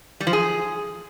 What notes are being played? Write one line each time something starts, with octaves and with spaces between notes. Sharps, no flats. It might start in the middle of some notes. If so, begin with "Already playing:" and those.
G3
F3
G#4